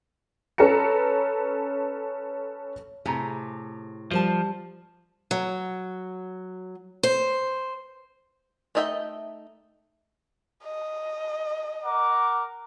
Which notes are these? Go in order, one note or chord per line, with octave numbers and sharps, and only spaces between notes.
C#4 A4 B4 A#5 C#7
A2 C3 G#4 A#5
F3 G3 C5 A5
F#3
C5
A3 D#4 D#5 E5 G5
D#5
A#4 F#5 D6